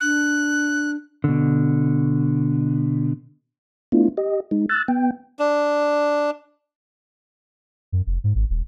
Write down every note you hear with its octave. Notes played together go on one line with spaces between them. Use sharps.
D4 F#6
B2 D3
A3 B3 D4 E4 F4
G4 D#5
G#3 D#4
E6 F#6 A6
B3 G5
D4
F#2
F1
G#2
G#1
D#1